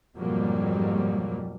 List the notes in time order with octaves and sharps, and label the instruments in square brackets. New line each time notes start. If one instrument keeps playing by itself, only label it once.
[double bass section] F2 G#2 B2 F#3 G3 A#3